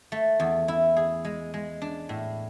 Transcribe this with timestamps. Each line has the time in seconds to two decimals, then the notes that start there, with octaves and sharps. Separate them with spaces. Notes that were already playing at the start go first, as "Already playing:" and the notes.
0.12 A3
0.40 E2
0.68 E4
0.97 G#4
1.25 G#3
1.54 G#3
1.82 D4
2.09 A2